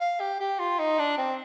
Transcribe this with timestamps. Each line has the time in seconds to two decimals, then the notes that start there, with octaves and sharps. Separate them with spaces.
0.01 F5
0.20 G4
0.40 G4
0.59 F4
0.79 D#4
0.99 D4
1.18 C4